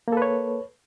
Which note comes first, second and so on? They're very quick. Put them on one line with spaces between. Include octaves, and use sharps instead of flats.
A#3 A4 B4 C#5